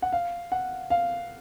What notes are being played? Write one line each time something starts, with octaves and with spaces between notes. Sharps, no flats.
F#5
F5
F#5
F5